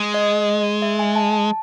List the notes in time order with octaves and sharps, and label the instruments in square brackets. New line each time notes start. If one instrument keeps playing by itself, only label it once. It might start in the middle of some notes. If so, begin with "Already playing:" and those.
Already playing: [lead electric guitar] G#3
[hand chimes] D#5
E5
G#5
A5
A5